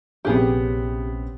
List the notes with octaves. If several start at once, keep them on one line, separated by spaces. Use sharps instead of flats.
A#1 C3 B3 C#4 G4 G#4